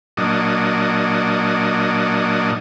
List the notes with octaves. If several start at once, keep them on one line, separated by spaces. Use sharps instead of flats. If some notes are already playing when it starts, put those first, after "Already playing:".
A#2 F#3 D4 D#5